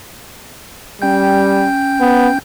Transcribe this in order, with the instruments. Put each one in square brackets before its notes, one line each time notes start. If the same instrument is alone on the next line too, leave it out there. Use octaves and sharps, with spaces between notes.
[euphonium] G3 [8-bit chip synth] C#4 G5 G6
[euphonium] B3